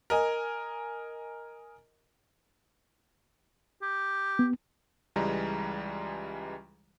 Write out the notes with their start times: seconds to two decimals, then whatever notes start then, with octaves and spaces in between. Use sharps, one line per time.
0.10 A#4 D#5 G#5
3.82 G4
4.39 B3
5.16 C#2 E3 G3 G#3 A#5